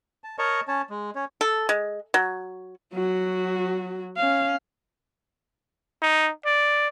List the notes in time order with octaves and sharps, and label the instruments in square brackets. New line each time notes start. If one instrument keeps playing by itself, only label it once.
[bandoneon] A5
A#4 C#5 D#5 A5 A#5 C#6
C#4 C#5 A5
G#3
C#4 C#5
[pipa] A4
G#3
F#3
[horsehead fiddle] F#3 F#4
C#4 F5
[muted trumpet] D#4
D5